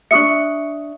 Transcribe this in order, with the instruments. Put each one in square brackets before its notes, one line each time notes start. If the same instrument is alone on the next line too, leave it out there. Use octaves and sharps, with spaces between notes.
[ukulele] D4 F4 E5 [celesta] C#6 D#6 C#7